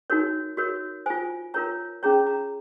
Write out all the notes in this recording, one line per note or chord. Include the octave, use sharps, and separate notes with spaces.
D#4 F#4 A#4 C#5
F#4 A#4 C#5
F4 C5 G#5
F4 A#4 C#5 A#5
C#4 G#4 C#5 A#5
A#5